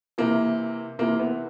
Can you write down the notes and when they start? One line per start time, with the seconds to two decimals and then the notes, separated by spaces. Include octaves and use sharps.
0.18 C3 E3 A#3
0.99 C3 E3 A#3
1.19 B3